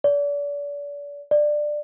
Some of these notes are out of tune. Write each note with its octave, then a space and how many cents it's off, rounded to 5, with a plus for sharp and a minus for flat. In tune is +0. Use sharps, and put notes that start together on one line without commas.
D5 -35
D5 +15